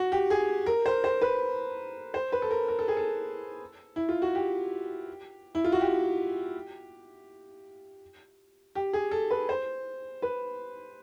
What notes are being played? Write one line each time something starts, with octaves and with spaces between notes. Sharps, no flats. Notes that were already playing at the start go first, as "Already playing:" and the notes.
Already playing: F#4
G4
G#4
A#4
C5
C5
B4
C5
B4
A4
A#4
A#4
A4
G#4
A4
E4
F4
F#4
G4
E4
F4
F#4
G4
G4
G#4
A4
B4
C5
B4